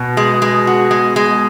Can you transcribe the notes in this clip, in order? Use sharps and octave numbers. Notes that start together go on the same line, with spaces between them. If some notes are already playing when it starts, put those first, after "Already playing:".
Already playing: B2
G#3
G#3
F#4
G#3
G#3